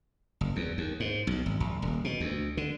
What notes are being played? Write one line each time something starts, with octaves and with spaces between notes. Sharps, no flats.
F#1
E2
D#2
G#2
B1
G#1
A#1
D#1
B2
D2
D3